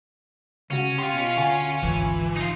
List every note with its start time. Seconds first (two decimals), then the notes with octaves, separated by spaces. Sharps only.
0.70 C#2 C#3 C#4 F#4
0.99 G4 F5 C6
1.13 B2
1.37 D2 F#5 G#5
1.83 G#1 D2 E3 F3
2.36 D#4 F4